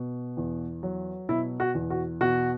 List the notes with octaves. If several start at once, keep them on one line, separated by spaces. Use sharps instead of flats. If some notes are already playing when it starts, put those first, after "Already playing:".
Already playing: B2
E2
F#3
B2 E4
F#4
E2
F#4
B2 F#4